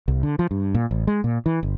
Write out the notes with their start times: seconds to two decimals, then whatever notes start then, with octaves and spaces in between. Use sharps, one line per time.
0.08 C2
0.23 D3
0.39 F3
0.51 G2
0.75 A#2
0.91 A1
1.07 G#3
1.24 A#2
1.46 E3
1.63 G1